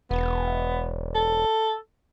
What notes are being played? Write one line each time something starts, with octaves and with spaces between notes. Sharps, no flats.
E1 B3
A4